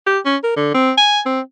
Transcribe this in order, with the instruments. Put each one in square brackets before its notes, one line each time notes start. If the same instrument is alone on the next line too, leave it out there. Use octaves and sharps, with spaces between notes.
[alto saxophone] G4
C#4
A#4
D3
C4
G#5
C4